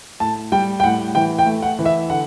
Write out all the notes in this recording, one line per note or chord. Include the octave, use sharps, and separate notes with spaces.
A2 A5
G3 G5
G5
A2 F#5
E3 G5
G5
A3
F#5
E3
E5
D3 F#5